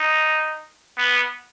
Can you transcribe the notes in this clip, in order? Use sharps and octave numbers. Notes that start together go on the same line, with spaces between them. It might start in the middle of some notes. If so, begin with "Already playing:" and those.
Already playing: D#4
B3